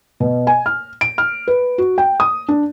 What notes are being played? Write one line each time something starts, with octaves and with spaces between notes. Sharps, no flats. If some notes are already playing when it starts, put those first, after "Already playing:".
B2
G#5
F6
D7
F6
B4
F#4
G5
D#6
D4